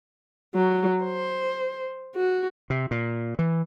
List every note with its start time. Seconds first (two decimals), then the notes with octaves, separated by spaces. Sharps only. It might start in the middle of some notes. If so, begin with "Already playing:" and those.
0.55 F#3
1.03 C5
2.16 F#4
2.70 C3
2.91 A#2
3.39 E3